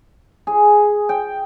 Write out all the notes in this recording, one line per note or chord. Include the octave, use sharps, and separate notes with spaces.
G#4
G5